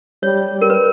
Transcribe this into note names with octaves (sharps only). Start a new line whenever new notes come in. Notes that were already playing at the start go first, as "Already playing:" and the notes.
G3 C#5
G3
A#4
B4